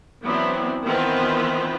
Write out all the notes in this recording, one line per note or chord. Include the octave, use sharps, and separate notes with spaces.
E3 F#3 B3 C4 D4 E4
D#3 E3 B3 C4 F4 B4